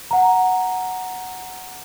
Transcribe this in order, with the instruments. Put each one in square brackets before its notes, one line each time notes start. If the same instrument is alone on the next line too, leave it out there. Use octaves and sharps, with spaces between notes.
[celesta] F#5 A#5